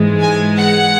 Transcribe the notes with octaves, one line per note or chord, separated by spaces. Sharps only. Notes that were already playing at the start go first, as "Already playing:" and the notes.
Already playing: G#2 E3 G#3
G#5
F#5